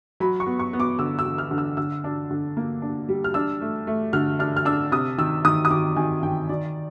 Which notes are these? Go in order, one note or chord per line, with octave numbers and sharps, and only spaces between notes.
F#3 B5
C#6
B3
C#6
B3
D6
D3 E6
E6
D3
F6
D3
E6
D3 E6
D4
D3
A#3
D4
G3
F6
D4 E6
A3
A3
D3 F6
D4 F6
F6
D4 E6
C3 D#6
D#3 E6
D#3 D#6
D#6
D#3 D6
D#3 G#5
D#3 G5
D#3 D5